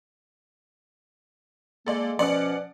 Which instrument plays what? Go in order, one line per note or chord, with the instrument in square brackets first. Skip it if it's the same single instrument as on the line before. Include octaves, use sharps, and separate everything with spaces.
[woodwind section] G#3 A#3 [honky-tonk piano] A4 D5
[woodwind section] B2 F3 C#4 [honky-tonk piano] D5 F#5 D6